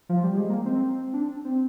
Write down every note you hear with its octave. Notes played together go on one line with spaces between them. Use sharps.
F3
G3
G#3
A#3
C4
D4
C4